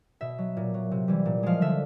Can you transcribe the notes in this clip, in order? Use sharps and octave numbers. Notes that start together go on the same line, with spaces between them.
B2 E5
F#3
A#2
F#3
C3
E3 G3
A#2
F3 G#3 F5
D3 E5